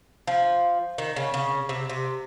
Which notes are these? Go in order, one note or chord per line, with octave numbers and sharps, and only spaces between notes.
F3
D#3
C#3
C#3
C3
C3